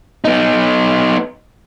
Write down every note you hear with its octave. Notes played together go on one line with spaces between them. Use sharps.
B3 D#4